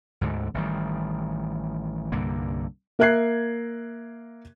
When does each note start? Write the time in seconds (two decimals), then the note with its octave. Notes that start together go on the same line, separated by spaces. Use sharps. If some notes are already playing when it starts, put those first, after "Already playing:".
0.21 D2 G#2 D3
0.54 A1 D#3 G3
2.12 C2 G2 D3 A#3
2.99 A#3 A#4 E5 F#6 G#6 C7